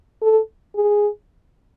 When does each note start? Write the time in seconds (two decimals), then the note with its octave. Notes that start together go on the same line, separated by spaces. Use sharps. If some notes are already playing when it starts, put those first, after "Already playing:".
0.22 A4
0.75 G#4